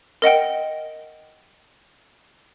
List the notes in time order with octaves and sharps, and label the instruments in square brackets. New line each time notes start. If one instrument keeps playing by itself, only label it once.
[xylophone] A#4 D#5 F#5 G5